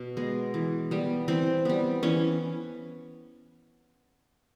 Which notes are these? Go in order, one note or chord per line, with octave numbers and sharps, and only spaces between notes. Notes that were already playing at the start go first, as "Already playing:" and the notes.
Already playing: B2
G#3 B3
E3
G3 B3
E3 C4
G3 B3
E3 C#4